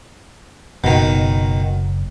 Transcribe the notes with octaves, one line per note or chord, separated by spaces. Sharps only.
F#1 B2 D#3